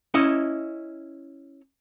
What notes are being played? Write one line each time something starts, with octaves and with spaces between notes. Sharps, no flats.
C#4 E4 D#5